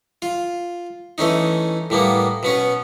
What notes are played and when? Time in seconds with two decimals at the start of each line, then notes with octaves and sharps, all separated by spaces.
0.22 F4
1.18 E3 A3 C#4 D#4
1.90 A2 G3 A#3 B3
2.43 B2 B3 C#4